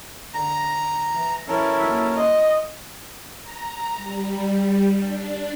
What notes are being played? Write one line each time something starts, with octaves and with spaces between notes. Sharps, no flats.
D3 A#5
E3
F#2 E3 C#4 E4 A4 A#4
D#2 F#3
C5 D#5
A#5
G3
D4